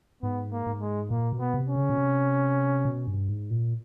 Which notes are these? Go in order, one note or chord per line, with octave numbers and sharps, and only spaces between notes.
G#2 B3
A#3
G#2
G#3
A#2 A#3
B2
B3
C3
C#4
C#3
B2
C3
B2
G2
G#2
A#2